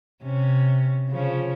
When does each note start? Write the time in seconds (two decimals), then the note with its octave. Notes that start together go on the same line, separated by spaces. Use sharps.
0.22 C3 C#4
1.10 C#3 F3 C#4